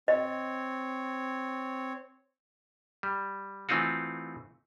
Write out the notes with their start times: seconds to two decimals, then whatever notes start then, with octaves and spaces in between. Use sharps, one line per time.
0.08 C4 C#5 D#5
3.03 G3
3.69 E3 A3 C4 D#4 F4 F#4